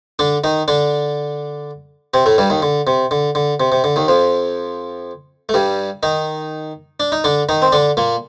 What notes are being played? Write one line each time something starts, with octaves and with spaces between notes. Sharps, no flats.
D3 D4
D#3 D#4
D3 D4
C3 C4
A2 A3
G2 G3
D#2 D#3
D3
C3
D3
D3
C3
C3
D3
D#2 D#3
F2 F3
A3
G2 G3
D#3 D#4
D4
D#4
D3 D4
D#3 D#4
C4
D3 D4
A#2 A#3